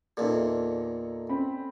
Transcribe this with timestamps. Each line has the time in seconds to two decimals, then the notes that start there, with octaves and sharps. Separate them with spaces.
0.17 E2 A#2 D#4 A4
1.29 C4 C#4 B5